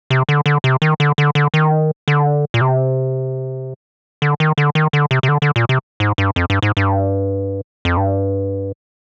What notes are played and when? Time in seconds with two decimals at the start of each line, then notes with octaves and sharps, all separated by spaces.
0.10 C3
0.29 D3
0.46 D3
0.64 C3
0.82 D#3
1.00 D3
1.18 D3
1.35 D3
1.54 D#3
2.08 D3
2.54 A#2
2.61 C3
4.22 D3
4.40 D#3
4.58 D3
4.75 D#3
4.93 D3
5.11 C3
5.23 C3
5.29 D3
5.42 D3
5.56 A#2
5.69 C3
6.00 G#2
6.18 G2
6.36 F2
6.50 G2
6.62 G#2
6.77 G2
7.85 F2
7.97 G2